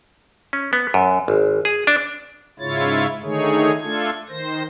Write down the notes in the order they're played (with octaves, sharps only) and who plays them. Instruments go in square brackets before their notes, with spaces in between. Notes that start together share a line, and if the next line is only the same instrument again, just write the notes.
[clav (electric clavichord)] C#4
B3
F#2
G#1
G#4
D4
[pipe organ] G#2 C#3 E4 F4 C#5 A6
D3 D#3 A3 D#4 G#4 C#5
A3 D4 F4 A4 G#6
D#3 C5 A#6